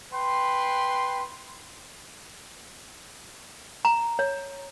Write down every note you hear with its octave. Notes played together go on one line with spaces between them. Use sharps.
B4 G5 C6
A#5
C#5